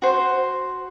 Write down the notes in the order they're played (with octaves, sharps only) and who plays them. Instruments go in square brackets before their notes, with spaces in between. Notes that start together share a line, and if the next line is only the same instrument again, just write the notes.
[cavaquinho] F#4 C5